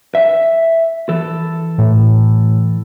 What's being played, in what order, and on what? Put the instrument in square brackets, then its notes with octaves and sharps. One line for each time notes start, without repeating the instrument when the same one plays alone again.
[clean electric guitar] E5
E3 A4
[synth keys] A2